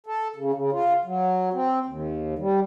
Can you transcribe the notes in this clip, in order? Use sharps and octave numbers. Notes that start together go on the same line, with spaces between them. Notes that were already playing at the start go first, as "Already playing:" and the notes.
A4
C#3
C#3
F4
F#3
C4
D#2
G3